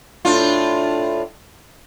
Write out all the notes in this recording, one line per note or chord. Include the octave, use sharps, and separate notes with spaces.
A2 D4 F4